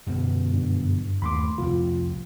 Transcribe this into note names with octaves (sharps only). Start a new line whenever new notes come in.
F#2 B2 D3
G2
D#2 A3 B5 C6 D6
C2 F2 A2 F4